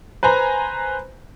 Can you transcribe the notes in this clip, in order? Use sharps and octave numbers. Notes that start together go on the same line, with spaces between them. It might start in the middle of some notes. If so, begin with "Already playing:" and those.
B4 C5 G#5 A#5